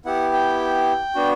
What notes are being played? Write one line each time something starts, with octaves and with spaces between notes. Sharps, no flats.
B3 E4 G4 F#5
G5
B3 D4 F#4